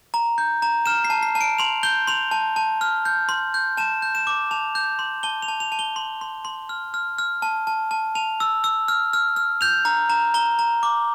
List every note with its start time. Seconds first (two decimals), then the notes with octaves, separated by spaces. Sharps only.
0.14 A#5
0.38 G6
0.62 A#5
0.86 F6 E7
1.04 C7
1.10 A5
1.23 C7
1.35 A5
1.41 D7
1.58 C6 F7
1.83 G6 G7
2.07 C6 F7
2.31 A5
2.56 A5
2.81 F6
3.05 G6
3.29 C6
3.54 G6
3.77 A5 E7
4.02 G6
4.15 E7
4.27 D6
4.51 A5 F7
4.75 G6
4.99 C6
5.23 A5 G7
5.42 F7
5.48 A5
5.60 F7
5.72 A5
5.79 G7
5.96 C6
6.21 C6
6.45 C6
6.69 F6
6.94 F6
7.18 F6
7.42 A5
7.67 A5
7.91 A5
8.15 A5 F7
8.40 E6
8.64 E6
8.88 F6
9.13 F6
9.36 F6
9.61 G6 F7
9.85 A#5
10.10 A#5
10.34 A#5 G7
10.59 A#5
10.83 D6